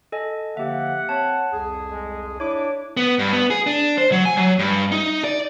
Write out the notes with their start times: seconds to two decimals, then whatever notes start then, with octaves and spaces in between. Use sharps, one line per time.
0.12 A4 D#5 G#5
0.57 D3 F3 A#3 G4 E5 F#5
1.09 C4 C#5 A5
1.52 C2 F2 G#4
1.91 G#3
2.40 D4 E4 C#5 D6
2.97 B3
3.19 G2
3.33 B3
3.50 G#4
3.67 D4
3.98 C5
4.12 F#3
4.25 G#5
4.37 F#3
4.59 G2
4.92 D#4
5.24 D5